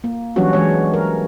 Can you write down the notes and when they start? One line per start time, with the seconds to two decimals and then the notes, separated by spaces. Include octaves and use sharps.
0.04 A#3
0.36 E3 F#3 G3 C#4 D4 F#4
0.53 E3 G#3 C#5
0.94 A#4